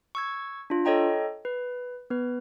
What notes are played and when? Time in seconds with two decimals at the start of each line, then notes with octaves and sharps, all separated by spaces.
0.15 C#6 E6 G#6
0.70 D4 F4
0.85 A4 C#5 D#5 G5 A#5
1.45 B4
2.10 B3 B4